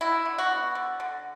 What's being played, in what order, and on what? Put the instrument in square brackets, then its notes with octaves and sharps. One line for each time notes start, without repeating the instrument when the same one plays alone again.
[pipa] F#3 E4
D3
F#4
B3
D3
D3